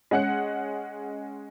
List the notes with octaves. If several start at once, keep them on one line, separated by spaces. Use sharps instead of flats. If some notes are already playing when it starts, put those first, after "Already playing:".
G#3 C#4 F#5 F#6 C#7